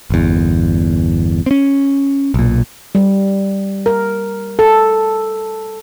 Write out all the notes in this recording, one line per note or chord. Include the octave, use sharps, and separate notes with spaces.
G1 E2
C4 C#4
B1 A#2
G3
A#4
A4